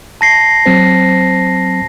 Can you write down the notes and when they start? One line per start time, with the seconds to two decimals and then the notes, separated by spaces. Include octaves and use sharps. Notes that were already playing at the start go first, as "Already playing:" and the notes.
0.21 A5 A#6 C7
0.66 F#3 C4 C5